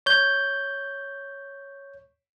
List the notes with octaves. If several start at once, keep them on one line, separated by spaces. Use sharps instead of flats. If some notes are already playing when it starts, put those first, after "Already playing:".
C#5 G6